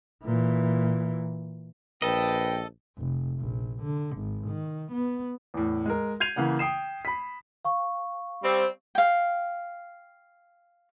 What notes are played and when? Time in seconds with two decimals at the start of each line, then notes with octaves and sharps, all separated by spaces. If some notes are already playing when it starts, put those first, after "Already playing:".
0.24 A#2 E3
2.02 A#1 A4 B4 D#5 G5
2.98 F1
3.39 A#1
3.83 D3
4.17 G#1
4.48 D#3
4.92 B3
5.54 E2 A2
5.86 G#3 A#4
6.20 G6 G#6 C7 D#7 F7
6.36 C#3 E3 A#3 F#5
6.59 G5 D#6 C7 E7
7.05 B5 B6
7.65 F5 C#6
8.44 G3 C4
8.95 F5 G5